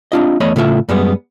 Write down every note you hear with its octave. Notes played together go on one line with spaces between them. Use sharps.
C4 D4 F4 D#5
E2 A3 C#5 D#5 B5
A2 C#3 A3 F4 E5
F#2 G3 G#3 B3